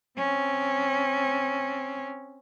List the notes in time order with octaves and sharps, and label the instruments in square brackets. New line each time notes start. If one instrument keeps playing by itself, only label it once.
[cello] C4 C#4